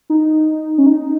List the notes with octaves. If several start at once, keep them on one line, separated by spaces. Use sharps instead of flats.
D#4
C#4
D#4